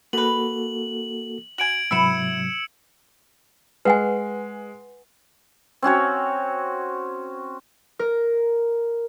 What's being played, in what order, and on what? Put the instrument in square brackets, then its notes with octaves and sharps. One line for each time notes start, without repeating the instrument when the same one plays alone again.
[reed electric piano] A#3 F#4 A4 [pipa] B3 B4 [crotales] F#7
[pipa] F#4 G#5 [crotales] G#6 D7 F#7
[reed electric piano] G#2 C3 F#3 [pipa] B3 E4 [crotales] E6 C#7 E7
[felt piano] G#3 [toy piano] B4 F#5 G#5
[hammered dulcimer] C4 C#4 F#4 C#5
[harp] A#4